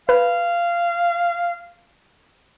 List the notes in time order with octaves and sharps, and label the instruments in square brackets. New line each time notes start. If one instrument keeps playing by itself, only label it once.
[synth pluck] B4 [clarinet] F5